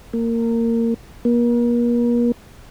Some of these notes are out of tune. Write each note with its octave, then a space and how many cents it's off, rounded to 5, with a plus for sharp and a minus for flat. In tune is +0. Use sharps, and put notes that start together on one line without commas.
A#3 -20
A#3 +40